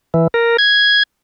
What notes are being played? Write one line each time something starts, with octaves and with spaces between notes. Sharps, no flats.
E3
A#4
G#6